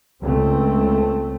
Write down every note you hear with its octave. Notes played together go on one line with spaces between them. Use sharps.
C#2 A3 C4